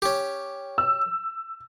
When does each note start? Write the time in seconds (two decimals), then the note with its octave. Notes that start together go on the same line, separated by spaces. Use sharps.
0.02 C#4 G4
0.78 E6